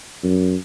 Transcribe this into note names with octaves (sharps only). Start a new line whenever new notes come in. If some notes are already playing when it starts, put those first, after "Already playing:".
F#2